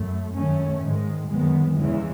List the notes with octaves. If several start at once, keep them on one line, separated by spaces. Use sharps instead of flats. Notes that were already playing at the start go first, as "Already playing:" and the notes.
Already playing: F#2 A3
F#2 D#3 A3 C#4
G#2 D#3 G#3
F#2 D#3 G#3 B3
E2 C#3 E3 G#3